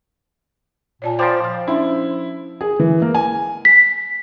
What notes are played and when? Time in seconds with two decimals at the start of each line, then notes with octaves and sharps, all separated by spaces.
1.02 A#2 C#5 D5 A5
1.19 F3 C5 D5 G5 B5
1.44 F3 F5
1.67 C#4 D4 E4
2.61 G#4
2.79 E3
3.02 A#3
3.14 G#5
3.65 B6